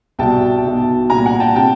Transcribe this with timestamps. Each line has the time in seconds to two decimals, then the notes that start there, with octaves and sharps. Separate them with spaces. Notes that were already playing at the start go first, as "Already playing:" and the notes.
0.19 C2 B2 G5 A5
0.65 B1 B2
1.10 C2 A#2 G#5 A#5
1.26 F#5 G#5
1.40 G5 A5
1.55 C3 G5 A5